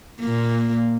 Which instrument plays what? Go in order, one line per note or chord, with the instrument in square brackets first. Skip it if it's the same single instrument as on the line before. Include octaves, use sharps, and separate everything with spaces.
[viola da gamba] A#2 A#3